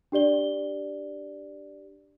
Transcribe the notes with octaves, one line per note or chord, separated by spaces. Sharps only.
D4 G4 D5 G7